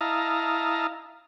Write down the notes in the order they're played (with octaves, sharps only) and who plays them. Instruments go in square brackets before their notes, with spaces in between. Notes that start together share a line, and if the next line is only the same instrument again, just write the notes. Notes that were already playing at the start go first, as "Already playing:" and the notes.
[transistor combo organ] E4 D#5 F5 A5 A#5